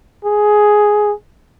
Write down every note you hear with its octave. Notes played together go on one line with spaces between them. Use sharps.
G#4